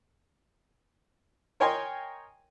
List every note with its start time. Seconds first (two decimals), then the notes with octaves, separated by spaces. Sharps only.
1.60 A#4 C#5 D#5 G5 G#5 C6